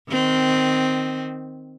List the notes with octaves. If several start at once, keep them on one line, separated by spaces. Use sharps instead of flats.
D#3 C4